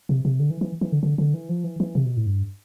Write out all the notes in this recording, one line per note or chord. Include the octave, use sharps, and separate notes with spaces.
C3
C3
D3
E3
E3
E3
D3
D3
D3
E3
F3
E3
E3
C3
B2
A2
G2